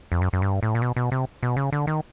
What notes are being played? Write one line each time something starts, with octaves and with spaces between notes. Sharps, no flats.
F2
F#2
F#2
G2
A2
A#2
B2
B2
C3
B2
C#3
D3
D#3